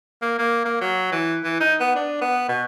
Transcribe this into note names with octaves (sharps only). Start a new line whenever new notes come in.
A#3
A#3
A#3
F#3
E3
E3
D#4
B3
D4
B3
B2